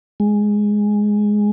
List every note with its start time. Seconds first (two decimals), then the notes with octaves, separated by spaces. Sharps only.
0.20 G#3